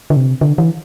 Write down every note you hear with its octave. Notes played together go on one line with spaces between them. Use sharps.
D3
C3
D3
E3